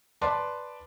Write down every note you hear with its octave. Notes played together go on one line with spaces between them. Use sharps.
B4 D5 A5 C6 D6